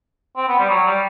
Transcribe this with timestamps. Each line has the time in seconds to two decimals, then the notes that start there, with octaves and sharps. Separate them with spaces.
0.37 C4
0.48 B3
0.59 G3
0.70 F#3
0.87 G3